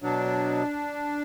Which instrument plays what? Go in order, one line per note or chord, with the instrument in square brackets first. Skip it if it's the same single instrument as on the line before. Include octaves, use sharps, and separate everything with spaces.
[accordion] B2 F#3 D4